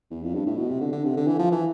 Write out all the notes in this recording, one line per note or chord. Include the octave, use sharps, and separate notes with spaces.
E2
F2
G2
A2
B2
C3
D3
D3
C3
D3
E3
F3
E3